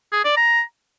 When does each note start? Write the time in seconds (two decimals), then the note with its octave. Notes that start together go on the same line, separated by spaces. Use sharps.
0.12 G#4
0.24 D5
0.36 A#5